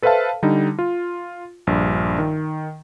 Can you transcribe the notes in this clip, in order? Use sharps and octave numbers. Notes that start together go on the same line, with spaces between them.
A4 B4 C5 E5 F5 A5
D3 G3 D#4
F4
A#1 G2
D#3